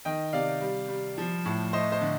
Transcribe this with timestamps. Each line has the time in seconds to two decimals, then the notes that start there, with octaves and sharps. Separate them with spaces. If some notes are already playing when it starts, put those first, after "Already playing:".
0.05 D#3 D#5 G5
0.33 C3 D5 F5
0.61 G3
0.89 G3
1.18 F3
1.46 A2
1.73 A3 C5 D#5
1.92 C5 D#5
2.01 D3